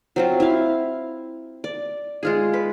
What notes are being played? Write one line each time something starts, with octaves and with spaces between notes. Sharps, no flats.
F#3 C4 F4
E4 F5
D5
G#3 F4 G#4
B4